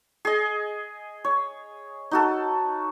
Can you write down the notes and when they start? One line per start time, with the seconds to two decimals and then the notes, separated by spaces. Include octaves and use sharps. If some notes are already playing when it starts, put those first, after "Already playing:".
0.25 G#4 D#5
1.25 C#5
2.11 D#4 F#4 A4